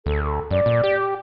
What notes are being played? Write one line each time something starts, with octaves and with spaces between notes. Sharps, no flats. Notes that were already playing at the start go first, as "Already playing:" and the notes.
D2 A4
A4
F#2 D5
A#2
G4